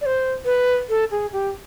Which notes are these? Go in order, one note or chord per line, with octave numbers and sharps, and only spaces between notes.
D5
C5
B4
A4
G#4
G4